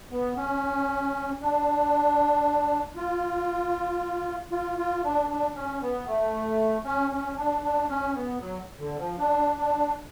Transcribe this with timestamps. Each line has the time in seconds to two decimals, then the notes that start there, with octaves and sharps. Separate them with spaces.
0.11 B3
0.37 C#4
1.41 D4
2.96 F4
4.51 F4
4.78 F4
5.04 D4
5.29 D4
5.55 C#4
5.81 B3
6.07 A3
6.85 C#4
7.11 C#4
7.37 D4
7.63 D4
7.89 C#4
8.14 B3
8.41 F#3
8.79 D3
8.98 F3
9.18 D4
9.57 D4